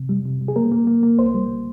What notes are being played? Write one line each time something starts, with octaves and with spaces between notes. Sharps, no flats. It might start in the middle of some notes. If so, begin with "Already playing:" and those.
Already playing: C3
G3
C3
G3
G#4
A#3 A#4
A#3
A#3
A#3
C2 C5
G3